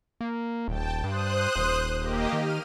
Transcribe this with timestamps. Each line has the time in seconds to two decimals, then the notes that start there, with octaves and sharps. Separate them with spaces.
0.21 A#3
0.68 D#1 G5 A5
1.04 G2 C5 D#6 F#6
1.56 D#1
2.00 A#3 G4 D#5
2.33 D#3 F6 D#7